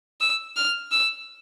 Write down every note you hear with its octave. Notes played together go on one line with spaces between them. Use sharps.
E6
F6
E6